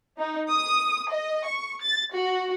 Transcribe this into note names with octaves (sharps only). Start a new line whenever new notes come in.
D#4
D#6
D#5
C#6
A6
F#4